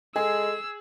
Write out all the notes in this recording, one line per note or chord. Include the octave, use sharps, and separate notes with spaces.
G#3 G#4 A4 E6